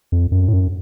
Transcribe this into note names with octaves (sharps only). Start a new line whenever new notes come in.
F2
F#2
A2
F#2